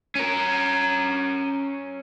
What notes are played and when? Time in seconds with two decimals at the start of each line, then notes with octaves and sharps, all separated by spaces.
0.15 C#4 A#4